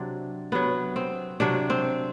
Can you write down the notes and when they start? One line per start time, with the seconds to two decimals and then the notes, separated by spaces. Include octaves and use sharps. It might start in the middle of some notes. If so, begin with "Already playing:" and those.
Already playing: C3 F#3 C4 D4
0.52 C3 F#3 B3
0.96 C4
1.40 C3 F#3 D4
1.70 C4